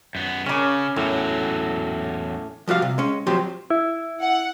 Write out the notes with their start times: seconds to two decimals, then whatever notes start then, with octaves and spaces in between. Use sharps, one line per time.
0.15 F#2 B3
0.46 C#3 C#4 D6
0.96 E2 A2 F#3
2.68 F3 G3 F#4 F5
2.82 C3
2.98 G#3 C#4
3.27 F3 F#3 C4 G4 C5
3.70 E4
4.20 F#5